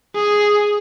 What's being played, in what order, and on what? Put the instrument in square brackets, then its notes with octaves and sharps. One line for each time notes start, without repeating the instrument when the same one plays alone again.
[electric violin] G#4